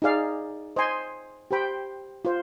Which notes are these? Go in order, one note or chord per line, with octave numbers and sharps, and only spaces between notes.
D#4 G#4 D5 F5
C5 D#5 G#5 C6
G4 C5 G5 B5
F4 C5